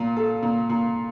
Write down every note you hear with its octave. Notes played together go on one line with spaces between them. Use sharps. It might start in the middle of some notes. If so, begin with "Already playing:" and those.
Already playing: A#2
A4
A#2
A#2